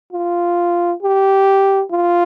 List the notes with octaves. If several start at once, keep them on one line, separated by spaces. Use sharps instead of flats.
F4
G4
F4